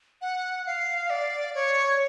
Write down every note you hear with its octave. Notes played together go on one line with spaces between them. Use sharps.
F#5
F5
D5
C#5